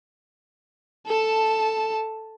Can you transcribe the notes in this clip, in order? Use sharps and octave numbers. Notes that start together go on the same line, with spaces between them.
A4 A5